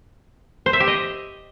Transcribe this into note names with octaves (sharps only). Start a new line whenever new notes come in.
C5
E5
G4
D#5